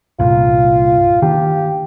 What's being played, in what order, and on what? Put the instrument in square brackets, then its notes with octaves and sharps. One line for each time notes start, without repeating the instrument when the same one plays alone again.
[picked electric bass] C2 G2 A#2 [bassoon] F4
[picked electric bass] D#3 A#3 D4 [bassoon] G4